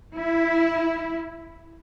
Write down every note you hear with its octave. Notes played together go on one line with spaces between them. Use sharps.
E4